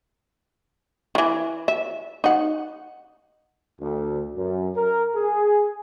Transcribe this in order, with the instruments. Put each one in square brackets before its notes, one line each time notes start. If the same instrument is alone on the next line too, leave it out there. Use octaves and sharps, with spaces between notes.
[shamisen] D#3 E3
E5
D#4 F#5
[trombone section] D2
F#2
A#4
G#4